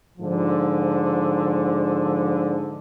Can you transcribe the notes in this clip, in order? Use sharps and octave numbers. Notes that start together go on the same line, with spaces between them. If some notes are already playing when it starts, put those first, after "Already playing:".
G#2 D3 F3